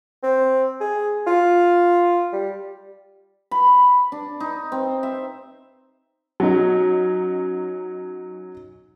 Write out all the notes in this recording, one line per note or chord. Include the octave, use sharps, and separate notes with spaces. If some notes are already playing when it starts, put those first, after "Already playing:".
C4
G#4
F4
G3
B5
D4
D#4
C4
E5
F#3 C#4 D#4